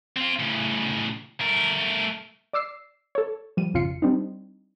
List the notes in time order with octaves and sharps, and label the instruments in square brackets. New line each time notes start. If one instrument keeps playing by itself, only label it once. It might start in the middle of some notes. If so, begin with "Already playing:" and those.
[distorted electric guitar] C4 F4
A2 C#3
A3 A#4
[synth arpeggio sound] D5 D6 E6 C7
A4 C#5
F3 G3 D#7
G#1 F2 C#3 F4 C7 C#7
G3 C4 D4 D#4